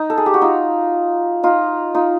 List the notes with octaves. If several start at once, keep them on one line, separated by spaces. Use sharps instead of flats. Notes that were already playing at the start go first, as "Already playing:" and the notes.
Already playing: D#4
A4
G#4
G4
F#4
D#4 F4
D#4 F4
D#4 F4